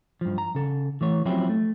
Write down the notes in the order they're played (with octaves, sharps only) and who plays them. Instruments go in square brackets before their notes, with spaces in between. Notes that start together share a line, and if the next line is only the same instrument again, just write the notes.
[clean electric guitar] G2 F3
A#5
C#3 A4
E3 A3 C#5
F3 F#3 C4 C#4 E4 G4
A3